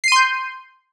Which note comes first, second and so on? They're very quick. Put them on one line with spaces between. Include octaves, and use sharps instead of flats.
C7 D#7 C6 G6